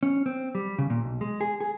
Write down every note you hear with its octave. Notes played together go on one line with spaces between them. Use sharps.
C#4
C4
G3
C#3
A#2
B1
G#3
G#4
G#4